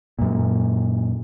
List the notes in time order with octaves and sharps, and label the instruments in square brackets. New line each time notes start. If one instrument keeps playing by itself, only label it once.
[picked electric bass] F#2 A#2